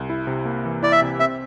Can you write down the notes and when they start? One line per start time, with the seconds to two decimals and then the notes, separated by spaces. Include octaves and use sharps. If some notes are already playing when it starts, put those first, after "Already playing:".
Already playing: C2
0.10 E4
0.27 C3
0.46 A#3
0.65 E3
0.83 E4 D5
0.92 E5
1.02 C3
1.20 C4 E5